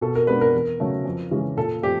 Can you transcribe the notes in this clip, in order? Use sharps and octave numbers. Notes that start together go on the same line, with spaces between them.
B2 A4
A#4
G#3 B3 D4 B4
A#4
E2
C#3 F#3 A3 C#4
F2
C#3 E3 G#3 C#4
A#2 A4
F3 A3 C4 G4